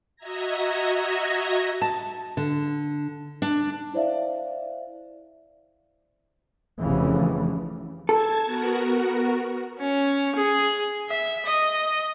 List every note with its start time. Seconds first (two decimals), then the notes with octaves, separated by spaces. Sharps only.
0.16 F#4 D#5 E5 A#5 G#6 A#6
1.82 A5
2.37 D3
3.42 D4
3.94 E4 C5 D5 E5 F5
6.79 F1 F2 C#3 E3
8.09 A4 A5 G#6
8.45 B3 F#4 A#4
9.80 C#4
10.35 G#4
11.09 E5
11.46 D#5